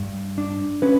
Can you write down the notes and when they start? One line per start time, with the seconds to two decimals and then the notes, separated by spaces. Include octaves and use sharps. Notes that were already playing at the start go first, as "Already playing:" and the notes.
Already playing: G2
0.38 D4
0.82 C#4 B4